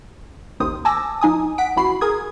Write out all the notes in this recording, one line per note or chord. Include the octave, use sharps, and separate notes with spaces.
A1 D#2 D#3 C5 D#6
G#5 A5 D6 E6 A#6
F3 D#4 G#5 D#6
F#5 B6 D7
A1 E3 F#4 B5 C7
G#4 A#4 D#6 G#6